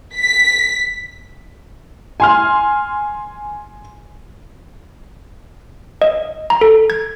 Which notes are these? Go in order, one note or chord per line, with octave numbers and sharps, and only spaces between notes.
B6
G#5 C6 F6
D#5
A#5
A4
G#6